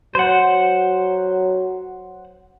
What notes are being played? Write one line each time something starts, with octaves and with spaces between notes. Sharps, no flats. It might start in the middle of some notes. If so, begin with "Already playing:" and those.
F#3 C5 F#5